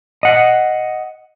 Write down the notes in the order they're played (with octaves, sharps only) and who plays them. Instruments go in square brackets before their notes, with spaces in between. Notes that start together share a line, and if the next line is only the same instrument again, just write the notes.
[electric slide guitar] D#5 F#5